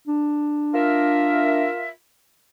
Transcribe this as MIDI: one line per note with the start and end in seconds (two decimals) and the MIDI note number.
0.08 1.68 62
0.74 1.88 65
0.74 1.88 70
0.74 1.88 76